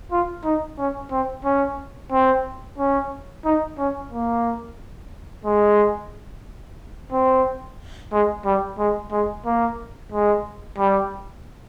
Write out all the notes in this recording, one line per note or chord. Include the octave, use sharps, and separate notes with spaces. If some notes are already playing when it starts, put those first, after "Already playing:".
F4
D#4
C#4
C4
C#4
C4
C#4
D#4
C#4
A#3
G#3
C4
G#3
G3
G#3
G#3
A#3
G#3
G3